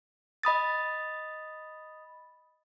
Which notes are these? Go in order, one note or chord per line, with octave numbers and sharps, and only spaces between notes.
D#5 B5 D#6 A6